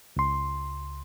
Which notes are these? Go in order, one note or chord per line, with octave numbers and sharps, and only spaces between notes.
C#2 C6